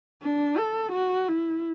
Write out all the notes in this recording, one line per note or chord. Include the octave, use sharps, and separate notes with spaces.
D4
A4
F#4
E4